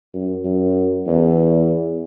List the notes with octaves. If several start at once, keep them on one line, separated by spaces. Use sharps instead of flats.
F#2
F#2
E2